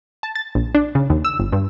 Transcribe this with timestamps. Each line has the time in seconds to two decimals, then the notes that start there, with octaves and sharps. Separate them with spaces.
0.23 A5
0.35 A6
0.55 A#1
0.75 D4
0.95 C#3
1.10 D#2
1.25 E6
1.39 G1
1.53 G2